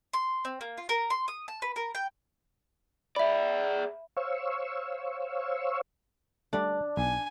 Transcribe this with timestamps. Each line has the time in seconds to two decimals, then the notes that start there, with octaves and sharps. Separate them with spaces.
0.13 C6
0.45 C4
0.61 A#3
0.78 F4
0.89 A#4
1.10 C6
1.28 D#6
1.48 A5
1.62 B4
1.76 A#4
1.95 G5
3.16 G#4 D5 E5 B5
4.17 C5 C#5 F5 C#6 E6
6.53 G3 A3 D4
6.97 B1 G#5